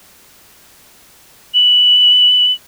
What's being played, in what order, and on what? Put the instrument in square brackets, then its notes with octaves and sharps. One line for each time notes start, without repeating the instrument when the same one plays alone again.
[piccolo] F#7